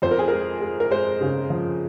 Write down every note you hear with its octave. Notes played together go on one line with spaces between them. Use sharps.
F2 C5
A#4
G#4
G#3 A#4
G#3
A#4
G#3 C5
C#3
F3